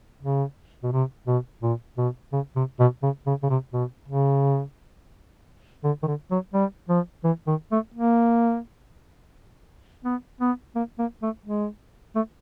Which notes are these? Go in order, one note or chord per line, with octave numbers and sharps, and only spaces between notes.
C#3
B2
C3
B2
A#2
B2
C#3
C3
B2
C#3
C#3
C#3
C3
B2
C#3
D3
D#3
D3
F#3
G3
F3
E3
D#3
A3
A#3
B3
B3
A#3
A#3
A3
G#3
A3